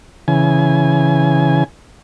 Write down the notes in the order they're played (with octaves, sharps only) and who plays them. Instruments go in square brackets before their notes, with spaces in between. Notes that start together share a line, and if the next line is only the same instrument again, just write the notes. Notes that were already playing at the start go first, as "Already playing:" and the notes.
[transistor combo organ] C#3 E3 G#5